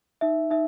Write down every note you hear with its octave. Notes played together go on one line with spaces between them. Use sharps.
D#4 E5
D#4 E5